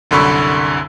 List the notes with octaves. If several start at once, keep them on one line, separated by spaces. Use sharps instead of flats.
C2 F#2 D3 B5 C#6 E6